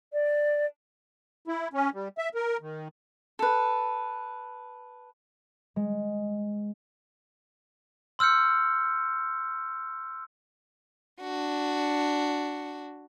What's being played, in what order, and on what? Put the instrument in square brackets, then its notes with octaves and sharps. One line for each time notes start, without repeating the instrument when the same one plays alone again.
[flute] D5
[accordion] E4
C#4
G3
E5
A#4
D#3
[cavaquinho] A4 B4
[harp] G#3
[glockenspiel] C6 E6 F6 G6 C#7
[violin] D4 F#4